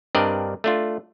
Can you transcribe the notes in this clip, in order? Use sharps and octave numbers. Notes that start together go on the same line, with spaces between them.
G2 C4 D4 A#4 D5 D#5
A3 D4 F4